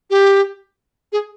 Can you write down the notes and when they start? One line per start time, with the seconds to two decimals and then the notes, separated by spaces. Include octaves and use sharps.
0.10 G4
1.12 G#4